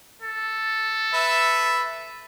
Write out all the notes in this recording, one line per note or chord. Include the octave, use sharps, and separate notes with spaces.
A4
B4 E5